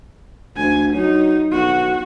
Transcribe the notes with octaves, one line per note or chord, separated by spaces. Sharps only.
D2 G#5
F#3 D#4
B1 F#4